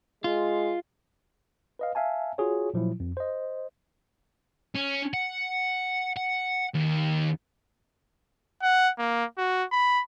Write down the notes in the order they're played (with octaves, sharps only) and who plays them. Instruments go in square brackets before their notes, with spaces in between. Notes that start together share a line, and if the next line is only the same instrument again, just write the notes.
[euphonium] G#3 [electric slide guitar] F4
[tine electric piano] B4 D#5 F5
E5 F5 G#5 A5
F4 F#4 G#4 C#5
A#2 F3 F#3 E4
F2
C5 D#5
[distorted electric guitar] C#4
F#5
F#5
D#2
[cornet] F#5
A#3
F#4
B5